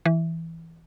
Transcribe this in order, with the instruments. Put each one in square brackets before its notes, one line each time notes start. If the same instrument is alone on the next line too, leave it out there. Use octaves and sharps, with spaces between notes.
[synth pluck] E3